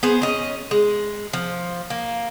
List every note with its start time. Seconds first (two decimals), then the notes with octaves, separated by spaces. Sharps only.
0.03 B3 G#4 C5
0.22 C#4 D#5
0.71 G#3
1.33 F3
1.90 A#3